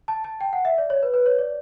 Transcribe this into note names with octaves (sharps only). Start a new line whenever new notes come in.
A5
A5
G5
F#5
E5
D5
C#5
B4
B4
C#5
D5